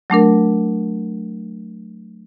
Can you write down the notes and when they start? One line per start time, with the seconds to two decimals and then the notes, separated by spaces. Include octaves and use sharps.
0.10 F#3 A3 D4 A#4